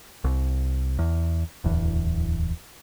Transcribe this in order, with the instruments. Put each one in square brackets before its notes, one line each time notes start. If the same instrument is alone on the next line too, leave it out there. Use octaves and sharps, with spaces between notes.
[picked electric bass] C2
E2
D1 E2